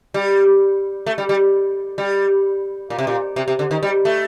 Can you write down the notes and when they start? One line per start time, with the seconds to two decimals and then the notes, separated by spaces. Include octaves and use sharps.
0.14 G3
1.06 A3
1.18 G3
1.29 G3
1.98 G3
2.90 A#2
2.99 C3
3.07 A#2
3.36 C3
3.48 C3
3.59 D3
3.71 D#3
3.83 G3
4.05 A3